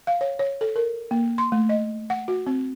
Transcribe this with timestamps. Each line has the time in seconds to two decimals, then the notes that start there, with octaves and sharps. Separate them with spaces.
0.07 F5
0.21 C#5
0.39 C#5
0.61 A4
0.76 A#4
1.11 A#3
1.38 C6
1.52 A3
1.69 D#5
2.10 F#5
2.28 F#4
2.47 C4